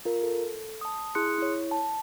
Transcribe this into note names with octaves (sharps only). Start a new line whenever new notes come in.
F4 A#4
A4
A5 D#6
E4 G#4 C6 D#6 F#6 C#7
E4 C#5
A5